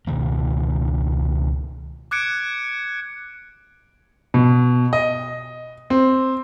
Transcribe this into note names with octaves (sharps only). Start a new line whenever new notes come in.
C#2 B2 D#3 A#3
D6 F#6 G#6 C#7 D7
B2
D#5
C4